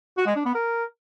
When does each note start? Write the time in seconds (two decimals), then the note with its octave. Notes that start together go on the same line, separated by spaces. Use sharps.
0.17 F#4
0.27 G#3
0.36 D4
0.45 B3
0.55 A#4